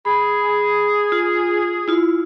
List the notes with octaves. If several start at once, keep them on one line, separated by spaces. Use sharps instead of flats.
G#4 B5
F4
E4 F4